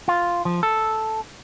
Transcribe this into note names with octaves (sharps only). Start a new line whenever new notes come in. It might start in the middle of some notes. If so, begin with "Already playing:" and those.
F4
F3
A4